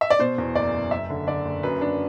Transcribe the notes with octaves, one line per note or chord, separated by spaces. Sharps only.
E5
D5
B2 C5
E2
F#1 D5
F#1
F#1 E5
D3
D3 D5
F#1
F#2 B4
D4